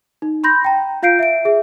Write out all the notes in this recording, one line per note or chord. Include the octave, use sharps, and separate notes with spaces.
D#4
B5 C6 G6 A#6
G5 A#5
F4 F5 G6 C7 D7
E5 D7
G#4 E5